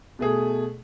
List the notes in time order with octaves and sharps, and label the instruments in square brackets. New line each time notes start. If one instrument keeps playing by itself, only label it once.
[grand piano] B2 A3 G#4